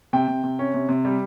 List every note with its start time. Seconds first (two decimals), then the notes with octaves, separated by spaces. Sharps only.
0.13 C3 G5
0.28 C3
0.44 C3
0.59 C#4
0.74 C3
0.89 C3
1.05 G3